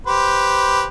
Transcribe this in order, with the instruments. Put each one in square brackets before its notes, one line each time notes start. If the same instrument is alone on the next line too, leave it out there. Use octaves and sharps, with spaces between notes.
[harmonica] G4 B4 C5